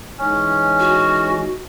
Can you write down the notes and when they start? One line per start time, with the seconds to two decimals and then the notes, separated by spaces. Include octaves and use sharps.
0.18 E3 G#3 C#4 D#4
0.80 F#4